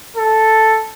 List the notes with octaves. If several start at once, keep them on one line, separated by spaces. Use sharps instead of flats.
A4